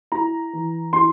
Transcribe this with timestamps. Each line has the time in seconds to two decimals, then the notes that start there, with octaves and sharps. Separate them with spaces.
0.12 E4 A#5
0.53 E3
0.93 E4 C6